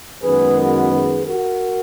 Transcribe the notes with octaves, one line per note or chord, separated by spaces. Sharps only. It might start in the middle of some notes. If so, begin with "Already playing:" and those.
F#2 D#3 G#3 B3 G#4 B4
F#4 A#4
G#4 B4
F#4 A#4